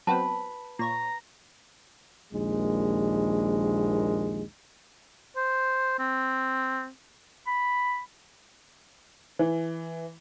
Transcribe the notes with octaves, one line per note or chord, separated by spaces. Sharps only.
F#3 B3 C4 B4 A5
A#2 C#5 A#5
A#1 D#2 G#3
C5
C4
B5
E3